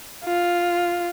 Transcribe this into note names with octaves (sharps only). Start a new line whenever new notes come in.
F4